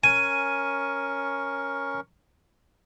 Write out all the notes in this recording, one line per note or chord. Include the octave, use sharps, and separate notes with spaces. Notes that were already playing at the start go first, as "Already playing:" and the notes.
C#4 A#4 G#5 C#6